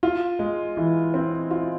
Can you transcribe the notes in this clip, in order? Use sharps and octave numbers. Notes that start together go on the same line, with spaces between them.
F4
G#3
E3
C4
F4